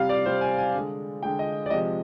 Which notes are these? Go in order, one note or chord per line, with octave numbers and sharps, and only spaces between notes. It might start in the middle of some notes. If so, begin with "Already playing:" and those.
Already playing: C3 G3 F5
D5
C3 G3 C5
G#5
G#5
D3 G#3
D3 G#3 G5
D#5
D5
C3 F3 G#3 D#5